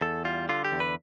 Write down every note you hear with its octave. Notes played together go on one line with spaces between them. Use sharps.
E2 A4
G3 F4
D3 F4
G4
E2
B4